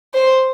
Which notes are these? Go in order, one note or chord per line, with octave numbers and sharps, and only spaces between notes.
C5